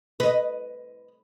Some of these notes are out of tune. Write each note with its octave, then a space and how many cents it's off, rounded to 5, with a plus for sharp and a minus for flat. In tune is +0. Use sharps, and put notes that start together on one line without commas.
B4 +0 D#5 +0